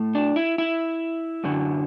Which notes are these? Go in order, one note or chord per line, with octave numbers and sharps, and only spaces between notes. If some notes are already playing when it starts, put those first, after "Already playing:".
Already playing: A2 A3
D4
E4
E4
F#2 D3 F#3